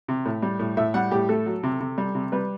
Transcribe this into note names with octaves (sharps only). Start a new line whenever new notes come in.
C3
A2
G3
A2
A2 E5
G3 F#5
A2 G4
A3 A4
F#3
C3
C3
G3
C3
G3 B4